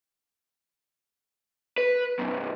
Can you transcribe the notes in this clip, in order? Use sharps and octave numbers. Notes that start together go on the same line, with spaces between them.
B4
B1 F#2